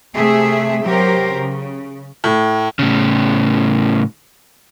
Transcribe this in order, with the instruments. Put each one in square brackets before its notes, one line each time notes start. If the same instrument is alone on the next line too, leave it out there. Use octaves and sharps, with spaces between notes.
[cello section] C3 A3 G#4 E5
C3 F#3 G4 A#4 C5
C#3
[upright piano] A2
[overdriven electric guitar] A2 C#3